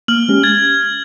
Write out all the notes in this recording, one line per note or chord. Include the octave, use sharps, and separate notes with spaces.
A#3 F6 F#7
G#3 C#4 G4
G#6 A6